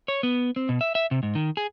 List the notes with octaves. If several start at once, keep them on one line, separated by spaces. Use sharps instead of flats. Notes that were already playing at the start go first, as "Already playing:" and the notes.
C#5
B3
C4
B2
E5
E5
C3
G#2
D#3
G#4